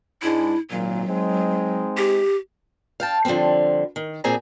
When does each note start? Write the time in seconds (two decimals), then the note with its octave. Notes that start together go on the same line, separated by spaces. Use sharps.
0.22 G#2 G#3 D4 E4
0.70 G#1 A#2 F#3
1.07 G#3 C4 D#4
1.97 G4
3.00 F5 G5 A5
3.25 D3 F3 G3 A#3 C4
3.96 D#3
4.24 A#2 F3 C4 G#4 G#5 A#5